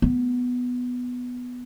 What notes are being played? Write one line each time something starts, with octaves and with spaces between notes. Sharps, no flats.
B3